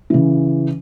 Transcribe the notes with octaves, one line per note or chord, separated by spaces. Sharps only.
C#3 E3